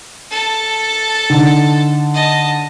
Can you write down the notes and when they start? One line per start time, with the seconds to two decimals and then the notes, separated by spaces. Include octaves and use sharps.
0.31 A4 A5
1.30 D3 D#4
2.14 D#5 A5